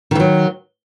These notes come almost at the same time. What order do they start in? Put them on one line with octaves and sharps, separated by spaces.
D#3 E3 F#3